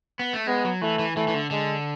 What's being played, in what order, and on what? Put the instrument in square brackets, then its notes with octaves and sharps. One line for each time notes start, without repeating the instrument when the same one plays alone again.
[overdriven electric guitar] B3
A3
[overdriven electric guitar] G#3 [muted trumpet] B3
[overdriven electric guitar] F#3
[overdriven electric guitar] E3 [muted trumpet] A3
[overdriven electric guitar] E3
[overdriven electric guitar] E3 [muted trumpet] A3
[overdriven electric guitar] E3
D3
[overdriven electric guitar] D3 [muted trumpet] G#3